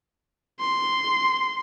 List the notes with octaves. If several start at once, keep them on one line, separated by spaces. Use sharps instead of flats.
C6